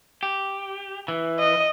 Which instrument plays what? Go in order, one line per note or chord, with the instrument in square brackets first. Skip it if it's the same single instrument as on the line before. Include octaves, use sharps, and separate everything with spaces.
[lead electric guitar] G4
E3
[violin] D#5